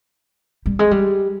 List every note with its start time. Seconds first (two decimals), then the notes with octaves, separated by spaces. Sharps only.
0.66 G3
0.79 G#3
0.91 G3